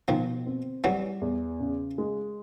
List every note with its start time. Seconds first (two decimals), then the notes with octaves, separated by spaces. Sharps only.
0.08 B2 D#3 F3
0.47 C4
0.84 E3 F#3 G3
1.21 E2
1.60 C#3
1.98 G#3